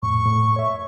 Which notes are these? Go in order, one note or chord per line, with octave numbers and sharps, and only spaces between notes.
F2 A2 C#6
A2
C#5 E5